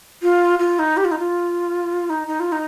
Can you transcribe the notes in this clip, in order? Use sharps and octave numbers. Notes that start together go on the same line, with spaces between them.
F4
F4
D#4
G4
F4
D#4
F4
D#4
D#4
F4
D#4